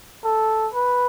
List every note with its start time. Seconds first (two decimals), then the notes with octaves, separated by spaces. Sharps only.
0.25 A4
0.74 B4